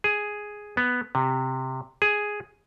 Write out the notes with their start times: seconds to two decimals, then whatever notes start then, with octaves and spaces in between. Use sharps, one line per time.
0.04 G#4
0.77 B3
1.15 C3
2.02 G#4